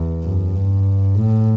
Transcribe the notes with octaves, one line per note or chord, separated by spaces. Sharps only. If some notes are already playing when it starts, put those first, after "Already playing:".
Already playing: E2
F#2
G2
A2